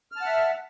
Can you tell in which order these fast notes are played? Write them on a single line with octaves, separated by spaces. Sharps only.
F6 A5 F#5 E5